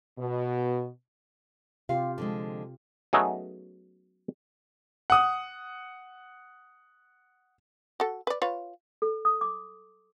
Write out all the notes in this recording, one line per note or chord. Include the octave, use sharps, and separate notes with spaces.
B2
C3 F4 G4 F5
D3 F3 G#3
F#3 A3 B3 C#4 D#4 G#4
F#5 D#6
F#4 A4
B4 D5
F4 B4 C#5
A4
D#6
D6